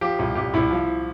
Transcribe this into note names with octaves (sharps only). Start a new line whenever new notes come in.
F3 G4
C2
C2 G4
C2 E4
F3